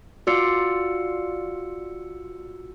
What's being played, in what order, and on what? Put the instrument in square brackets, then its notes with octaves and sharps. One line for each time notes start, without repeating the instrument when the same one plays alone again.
[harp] F4 D5 [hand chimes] F#4 E6 C#7